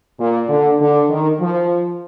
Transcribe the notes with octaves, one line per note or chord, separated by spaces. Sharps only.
A#2
D3
D3
D#3
F3